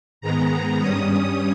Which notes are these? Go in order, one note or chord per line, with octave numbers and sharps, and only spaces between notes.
G#2 D#3 G#3 B3 A#5
G2 G3 C#4 D#6